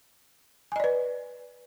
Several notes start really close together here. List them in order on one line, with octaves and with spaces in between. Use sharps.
G#5 D#5 D5 B4